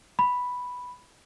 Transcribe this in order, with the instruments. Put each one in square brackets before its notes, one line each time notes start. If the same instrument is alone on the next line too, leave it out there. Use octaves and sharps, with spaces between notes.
[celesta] B5